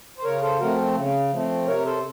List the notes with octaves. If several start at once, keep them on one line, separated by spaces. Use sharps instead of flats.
C5
C#3 A#4 C#5
A4 C5
F3 A3 C4 F#4 A#4
C#3
F3 A3 C4
C3 A#4 C#5
A4 C5